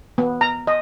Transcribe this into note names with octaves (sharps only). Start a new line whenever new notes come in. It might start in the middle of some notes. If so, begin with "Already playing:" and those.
B3
A#5
D#5